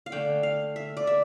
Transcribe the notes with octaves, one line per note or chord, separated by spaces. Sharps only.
F5
D3 A3 D4 G5
F5
E5
D5
E5